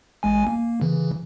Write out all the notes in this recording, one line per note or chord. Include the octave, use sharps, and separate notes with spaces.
A1 G#3 G#5
A#3
C#3 E3